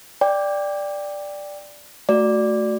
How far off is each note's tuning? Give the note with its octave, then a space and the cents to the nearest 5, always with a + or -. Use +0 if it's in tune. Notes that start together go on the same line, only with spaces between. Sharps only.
D5 +0 G5 +15
A3 +0 F#4 +0 D5 +0